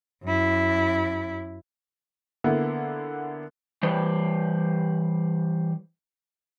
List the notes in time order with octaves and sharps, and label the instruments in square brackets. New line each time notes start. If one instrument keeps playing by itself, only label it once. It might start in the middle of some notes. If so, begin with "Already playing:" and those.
[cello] F#2 E4
[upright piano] D3 A#3 B3 E4
[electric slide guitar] E3 G3 G4 B4 C5